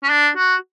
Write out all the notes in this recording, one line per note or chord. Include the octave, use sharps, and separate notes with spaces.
C#4
D4
F#4